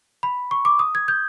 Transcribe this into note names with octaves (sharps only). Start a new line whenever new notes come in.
B5
C#6
D6
D#6
G#6
G6